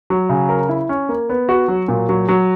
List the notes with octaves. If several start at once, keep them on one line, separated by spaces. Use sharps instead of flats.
F#3
C#3
A#4
E4
C#4
A#3
B3
F#4
F#3
A#2
F#3
F#3